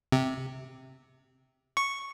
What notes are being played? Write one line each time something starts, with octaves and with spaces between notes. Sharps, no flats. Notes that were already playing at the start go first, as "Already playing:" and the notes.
C3
C#6